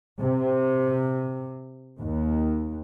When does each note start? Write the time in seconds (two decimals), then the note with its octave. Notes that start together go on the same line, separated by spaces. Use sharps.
0.21 C3
1.98 D#2